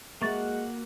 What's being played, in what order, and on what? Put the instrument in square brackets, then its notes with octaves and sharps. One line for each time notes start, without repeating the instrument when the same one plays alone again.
[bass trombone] G#3 [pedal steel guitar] A#3 F#4 F#5 [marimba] E5 C#6 A6